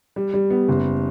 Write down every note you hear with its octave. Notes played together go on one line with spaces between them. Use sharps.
G3
G3
B3
F#1